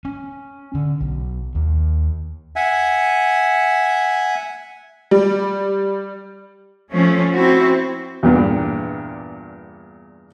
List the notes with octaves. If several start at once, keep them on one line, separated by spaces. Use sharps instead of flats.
C#4
D3
B1
D#2
E5 F#5 G#5
G3
F3 A3 C#4
C4 E4 F#4
E2 G2 A#2 B3 D4